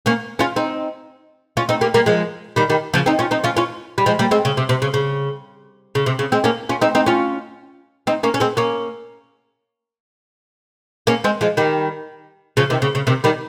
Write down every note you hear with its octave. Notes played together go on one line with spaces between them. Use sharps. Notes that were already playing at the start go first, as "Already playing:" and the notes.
A#3 C#4
C#4 F4
C4 D#4
C#4 F4
C4 D#4
G3 A#3
G3 A#3
F3 G#3
D#3 G3
D#3 G3
C#3 F3
C4 D#4
C#4 F4
C4 D#4
C#4 F4
C#4 F4
G3
F3 G#3
G3 A#3
G#3 C4
C#3
C3
C3
C#3
C#3
C#3
C3
C#3
G#3 C4
A#3 C#4
C#4 F4
C4 D#4
C4 D#4
C#4 F4
C4 D#4
A#3 C#4
C#4
G#3 C4
A#3 C#4
A#3 C#4
G#3 C4
F3 G#3
D#3 G3
C#3 F3
C3 D#3
C#3
C#3
C3 D#3
D#3 G3